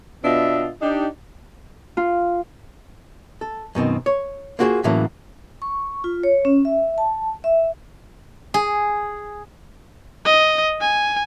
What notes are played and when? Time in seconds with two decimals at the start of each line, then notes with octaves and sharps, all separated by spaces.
0.24 B2 B3 D4 F4 D#5 E5
0.82 D4 D#4 G4
1.97 F4
3.41 A4
3.75 F#2 B2 D#3 C4
4.06 C#5
4.59 A#3 F4 F#4 G#4 B4 C5
4.84 A2 C#3 E3 F#3 A#3
5.62 C#6
6.04 F4
6.23 C#5
6.45 C#4
6.65 E5
6.98 A5
7.44 E5
8.54 G#4
10.25 D#5
10.81 G#5